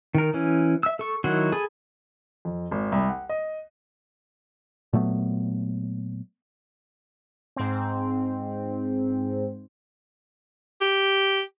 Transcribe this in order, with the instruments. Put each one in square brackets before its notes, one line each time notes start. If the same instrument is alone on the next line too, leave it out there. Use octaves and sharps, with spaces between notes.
[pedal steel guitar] D#3 A#4
E3 C#4
E5 E6
A4 C#6
D#3 F#3 E4 F#4 C6
G#4 A4 G#5 B5 D#6
[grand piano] F2
G#1
C2
F#5
D#5
[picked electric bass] A#2 F#3 A3 B3
[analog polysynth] G#2 C4
[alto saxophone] G4